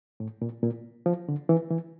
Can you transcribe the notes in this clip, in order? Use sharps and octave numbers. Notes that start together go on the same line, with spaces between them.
A2
A#2
A#2
F3
D3
E3
E3